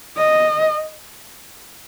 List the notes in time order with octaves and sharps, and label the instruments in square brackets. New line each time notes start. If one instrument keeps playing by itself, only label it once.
[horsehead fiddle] D#5